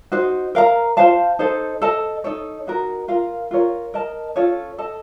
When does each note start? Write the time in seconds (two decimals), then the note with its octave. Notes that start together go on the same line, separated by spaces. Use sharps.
0.12 D#4 F#4 C5
0.55 A#4 F5 A#5
0.97 F4 C5 F5 A5
1.39 D#4 A4 C5
1.82 A4 D#5 A5
2.24 D#4 A4 C#5
2.67 D#4 F#4 A#4
3.08 F4 A#4 F5
3.51 F4 A#4 C#5
3.94 A#4 D#5 A5
4.36 C#4 F4 A4 C#5
4.78 A4 D#5 A5